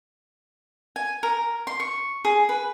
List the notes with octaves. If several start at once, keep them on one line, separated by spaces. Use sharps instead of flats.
G#5
A#4
C6
C#6
G#4
B4